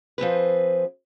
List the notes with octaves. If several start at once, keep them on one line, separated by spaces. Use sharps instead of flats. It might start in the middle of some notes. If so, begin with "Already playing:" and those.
F3 C4 G#4 B4